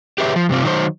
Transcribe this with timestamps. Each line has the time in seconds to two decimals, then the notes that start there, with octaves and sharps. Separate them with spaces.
0.18 G4 G#4 B4 C#5 E5
0.36 F3
0.49 G2 C3 C4 F4
0.63 D#3 F#3 C5